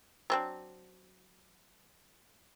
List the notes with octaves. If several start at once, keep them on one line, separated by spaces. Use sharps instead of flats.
F#3 C4 D4